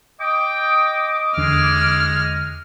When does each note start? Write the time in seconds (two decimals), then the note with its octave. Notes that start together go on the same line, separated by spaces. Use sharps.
0.21 D#5 G5 D6 D#6
1.37 E2 D3 G#3 F6